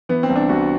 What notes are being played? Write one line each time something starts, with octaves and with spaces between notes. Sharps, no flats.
E3 B3
C4
C2
D4
C2 F#4